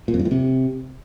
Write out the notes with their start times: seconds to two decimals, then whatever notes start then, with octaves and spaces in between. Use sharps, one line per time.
0.08 A#2
0.14 F2
0.19 G2
0.25 A2
0.31 C3